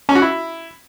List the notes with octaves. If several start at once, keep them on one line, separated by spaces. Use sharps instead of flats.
C#4
F#4
E4